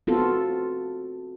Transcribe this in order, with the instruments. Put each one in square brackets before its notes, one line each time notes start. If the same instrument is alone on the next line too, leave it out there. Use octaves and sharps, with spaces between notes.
[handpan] B3 C4 F4 F#4 A4